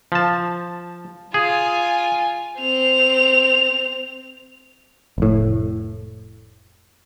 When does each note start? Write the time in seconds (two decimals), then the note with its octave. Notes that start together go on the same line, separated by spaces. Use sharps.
0.12 F3 A5
1.34 F4 G#4 G#5
2.59 C4 F7
5.18 F1 A2